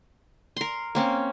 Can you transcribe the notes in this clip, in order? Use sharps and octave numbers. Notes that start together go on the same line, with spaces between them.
A#4 C6
A#3 C4 C#4